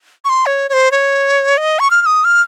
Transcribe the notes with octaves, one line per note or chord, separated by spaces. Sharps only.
C#6
C6
C#5
C#5
C5
C#5
D#5
C#6
F6
F6
D#6
F6